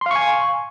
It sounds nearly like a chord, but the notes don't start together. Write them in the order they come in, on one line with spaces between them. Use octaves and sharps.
C6 F5 C#6 G#5